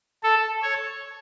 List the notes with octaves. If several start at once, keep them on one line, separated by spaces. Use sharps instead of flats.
A4
C#5